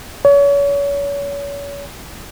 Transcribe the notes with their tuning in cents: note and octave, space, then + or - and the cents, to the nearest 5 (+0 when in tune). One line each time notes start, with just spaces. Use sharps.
C#5 +35